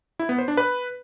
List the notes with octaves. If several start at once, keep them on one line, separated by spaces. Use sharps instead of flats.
E4
B3
C5
D4
B4